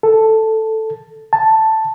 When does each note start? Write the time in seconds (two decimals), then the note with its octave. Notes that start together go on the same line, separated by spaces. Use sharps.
0.03 A4
1.33 A5